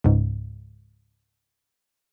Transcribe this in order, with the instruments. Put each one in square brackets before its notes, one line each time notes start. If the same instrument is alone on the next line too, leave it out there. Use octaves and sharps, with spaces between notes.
[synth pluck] C#2 G#2